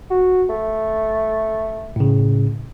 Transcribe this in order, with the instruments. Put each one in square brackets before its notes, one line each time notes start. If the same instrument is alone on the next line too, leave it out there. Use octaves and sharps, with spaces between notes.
[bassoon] F#4
A3
[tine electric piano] A2 C#3